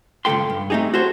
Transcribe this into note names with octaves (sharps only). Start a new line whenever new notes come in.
C#2 G2 A3 A4 G5 C6
G2
A3 C4 D#4 G4 G#4
F#4 A4 C5 C#5